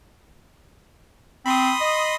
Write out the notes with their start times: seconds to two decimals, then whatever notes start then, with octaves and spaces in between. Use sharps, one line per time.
1.46 C4 B5 C6 D#6
1.81 D#5